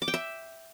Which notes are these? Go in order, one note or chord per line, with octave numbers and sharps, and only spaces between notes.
D6
G5
E5